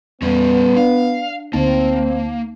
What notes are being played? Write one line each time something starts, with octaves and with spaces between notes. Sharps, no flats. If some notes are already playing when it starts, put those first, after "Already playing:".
E2 G3 B3 C#4
D4 F5
D2 A#3 C4 D#4 A5